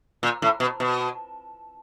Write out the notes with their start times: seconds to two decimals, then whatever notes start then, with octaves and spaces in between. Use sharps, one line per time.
0.23 A#2
0.42 A2
0.60 B2
0.80 B2